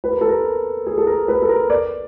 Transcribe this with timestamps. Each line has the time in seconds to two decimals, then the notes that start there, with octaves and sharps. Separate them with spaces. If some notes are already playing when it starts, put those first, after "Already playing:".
0.04 B4
0.12 A#4
0.21 A4
0.29 A#4
0.87 G#4
0.98 A4
1.07 A#4
1.28 B4
1.42 A4
1.49 A#4
1.70 D5